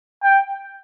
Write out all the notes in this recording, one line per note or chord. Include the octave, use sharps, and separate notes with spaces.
G5